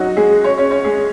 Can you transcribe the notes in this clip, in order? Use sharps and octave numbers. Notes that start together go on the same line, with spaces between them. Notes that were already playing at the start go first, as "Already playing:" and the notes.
Already playing: F#3 D#4 F#4
G#3 G#4
C#4 C#5
C#4 C#5
C#4 C#5
G#3 G#4